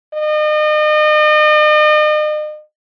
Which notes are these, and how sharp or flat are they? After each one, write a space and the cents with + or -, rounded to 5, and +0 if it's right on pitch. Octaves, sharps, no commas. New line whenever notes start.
D#5 -40